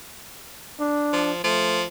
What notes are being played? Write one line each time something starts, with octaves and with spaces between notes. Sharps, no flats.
D4
F3
F3 A3